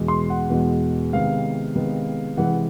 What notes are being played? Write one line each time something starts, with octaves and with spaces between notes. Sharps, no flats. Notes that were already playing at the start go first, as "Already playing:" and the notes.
Already playing: E2 B2 G#3
C6
F#5
E2 B2 G#3
C3 D#3 G#3 B3 F5
C3 D#3 G#3 B3
C3 E3 G#3 F#5